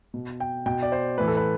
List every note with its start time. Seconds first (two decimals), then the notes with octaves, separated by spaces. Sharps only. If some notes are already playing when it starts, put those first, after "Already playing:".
0.14 B2
0.40 G5
0.66 B2 G5
0.83 D5
0.92 C5
1.18 A2 E3 B4
1.27 A4
1.37 B4